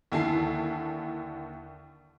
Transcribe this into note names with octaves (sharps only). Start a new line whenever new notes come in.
D#2 D3 E4 G#5 A5 C7